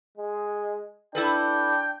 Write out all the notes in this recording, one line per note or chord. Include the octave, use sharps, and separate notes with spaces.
G#3
D4 E4 A4 B4 G5